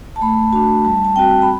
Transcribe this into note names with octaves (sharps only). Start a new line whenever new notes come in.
A5
A3 B5
D4 F#4 A5
G3 A5
A5
C4 F#4 G5
B5